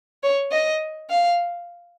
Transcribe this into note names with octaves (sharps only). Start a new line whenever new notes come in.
C#5
D#5
F5